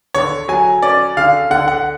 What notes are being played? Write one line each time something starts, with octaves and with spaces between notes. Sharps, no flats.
D3 C#5
F#3 G#5
C#4 D5
D3 F5
D3 F#5
F#5